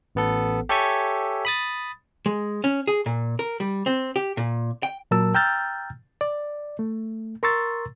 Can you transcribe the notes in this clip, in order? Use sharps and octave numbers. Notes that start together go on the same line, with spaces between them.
A1 B3 A4
G4 A4 C#5 E5 G#5 C#6
B5 D#6 A6
G#3
C#4
G#4
A#2
A#4
G3
C4
G4
A#2
G5
A#2 F#3 A#4 A5 E6
G5 A#5 E6 F6 G6 A6
D5
A3
A#4 A#5 C6 C#6 E6 A6